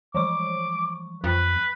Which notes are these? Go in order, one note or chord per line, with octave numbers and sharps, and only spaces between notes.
E3 F3 C#6 D6
F2 B4